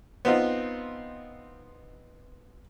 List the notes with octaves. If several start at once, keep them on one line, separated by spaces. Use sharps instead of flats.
B3 C4 D#4 F4